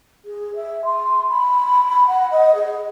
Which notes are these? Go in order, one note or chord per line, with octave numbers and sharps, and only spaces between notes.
G#4
E5
C6
B5
F#5
D#5
G#4